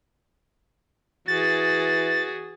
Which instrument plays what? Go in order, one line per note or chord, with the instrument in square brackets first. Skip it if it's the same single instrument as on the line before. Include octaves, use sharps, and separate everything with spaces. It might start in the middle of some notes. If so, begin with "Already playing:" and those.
[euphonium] E3 [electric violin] F#4 G#4 [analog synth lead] A6